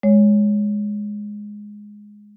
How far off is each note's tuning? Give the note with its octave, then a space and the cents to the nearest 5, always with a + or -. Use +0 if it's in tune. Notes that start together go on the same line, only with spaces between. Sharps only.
G#3 +0 C#5 +10